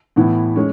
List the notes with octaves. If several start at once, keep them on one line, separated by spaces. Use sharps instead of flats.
A2 E3 B3 E4
G#3 C#4